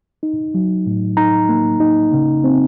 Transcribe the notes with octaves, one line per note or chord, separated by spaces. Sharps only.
D#4
F#3
A2
D#4 A#5
A#3
D#4
C#3
C4